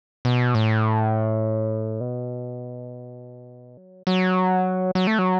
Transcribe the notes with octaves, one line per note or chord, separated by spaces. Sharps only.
B2
A2
B2
F#3
F#3
F#3
A3
F#3